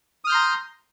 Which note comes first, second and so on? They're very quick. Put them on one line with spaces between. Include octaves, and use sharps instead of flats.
D#6 F6 G6 C6 A#5